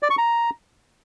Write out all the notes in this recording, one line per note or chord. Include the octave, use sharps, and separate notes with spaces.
D5
C#6
A#5